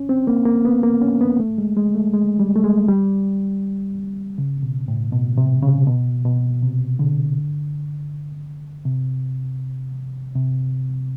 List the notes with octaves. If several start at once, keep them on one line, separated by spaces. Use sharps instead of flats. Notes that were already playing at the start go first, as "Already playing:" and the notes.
Already playing: C#4
C4
A#3
A#3
B3
A#3
C#4
B3
A3
G#3
G#3
A3
G#3
G3
A3
G#3
G3
C#3
B2
A2
B2
C3
C#3
B2
B2
C3
D3
C3
C3